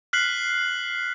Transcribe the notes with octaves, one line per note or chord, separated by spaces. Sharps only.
F6 F#6 B6 C7 F#7